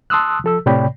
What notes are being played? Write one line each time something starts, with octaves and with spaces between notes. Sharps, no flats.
A5 C6 D#6 E6 F#6
F3 A4 E6
A2 C3 C#5 D5 G5 B5